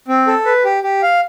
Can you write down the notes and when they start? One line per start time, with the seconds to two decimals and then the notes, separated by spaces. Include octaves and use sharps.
0.08 C4
0.27 A4
0.45 B4
0.65 G4
0.83 G4
1.02 F5